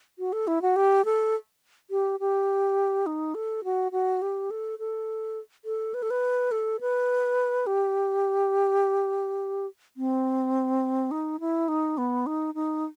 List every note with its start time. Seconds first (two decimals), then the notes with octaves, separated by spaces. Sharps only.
0.19 F#4
0.33 A4
0.47 E4
0.62 F#4
0.76 G4
1.05 A4
1.91 G4
2.20 G4
3.06 D#4
3.35 A4
3.64 F#4
3.92 F#4
4.22 G4
4.51 A4
4.79 A4
5.65 A4
5.94 B4
6.02 A4
6.10 B4
6.51 A4
6.81 B4
7.67 G4
9.97 C4
11.11 D#4
11.40 E4
11.68 D#4
11.98 B3
12.26 D#4
12.55 D#4